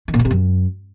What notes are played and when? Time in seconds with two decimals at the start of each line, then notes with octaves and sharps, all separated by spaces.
0.08 D#3
0.14 A#2
0.19 B2
0.25 C3
0.31 F#2